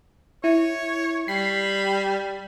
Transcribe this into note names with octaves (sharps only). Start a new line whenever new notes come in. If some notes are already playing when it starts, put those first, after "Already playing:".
E4 C#5
G3 B5 C7